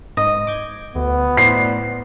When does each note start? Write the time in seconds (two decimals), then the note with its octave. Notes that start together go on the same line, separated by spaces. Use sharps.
0.17 G#2 D#5
0.47 D6 G6 G#6
0.95 D2 B3
1.37 A2 C5 D5 C7